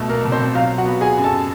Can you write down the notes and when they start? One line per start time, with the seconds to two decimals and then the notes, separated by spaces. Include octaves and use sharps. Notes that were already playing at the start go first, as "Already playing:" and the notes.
Already playing: B2 A3 B3 A4
0.09 A#3 A#4
0.25 B2
0.32 C4 C5
0.55 F#3 F4 F5
0.78 F#4 F#5
0.85 B3
1.01 G#4 G#5
1.17 F#2
1.24 A4 A5